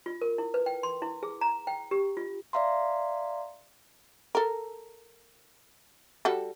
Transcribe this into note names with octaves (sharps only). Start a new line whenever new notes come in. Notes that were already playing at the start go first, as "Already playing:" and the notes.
F4
A#4
E4
B4
G5
C6
E4
G#4
A#5
G5
G4
F4
D5 E5 F5 A#5 C6
A4 A#4
G3 F#4 A4